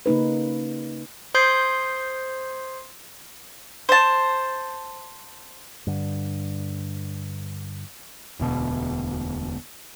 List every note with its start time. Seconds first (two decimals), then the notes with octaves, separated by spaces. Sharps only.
0.06 C#3 A#3 D#4 B4
1.34 C5 C6 D#6 G6 G#6 C7
3.89 C5 A5
5.87 G2 D3
8.40 E1 D2 B2